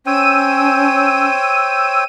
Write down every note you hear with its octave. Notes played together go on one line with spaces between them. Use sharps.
C#4 C5 C#5 G5 E6 D#7